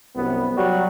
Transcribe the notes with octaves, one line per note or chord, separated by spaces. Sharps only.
C2 F#2 B3
F#3 G3 F#4